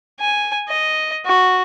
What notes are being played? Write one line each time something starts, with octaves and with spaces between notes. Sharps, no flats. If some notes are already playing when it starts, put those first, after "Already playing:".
G#5
D#5
F#4